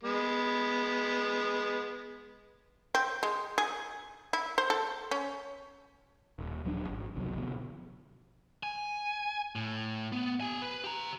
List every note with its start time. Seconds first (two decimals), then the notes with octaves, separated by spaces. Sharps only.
0.03 G#3 B3
2.95 C4
3.23 G#3
3.58 G#4
4.33 E4
4.58 C5
4.70 A4
5.11 C#4
6.39 D#1
6.65 D#1 F3 F#3 D4
6.89 G#1
7.15 G1 C#2 C3 F#3
7.37 B2 D3 F3 B3
8.63 G#5
9.55 A2
10.13 B3
10.41 G4 G#5
10.62 B4
10.84 G4 A#5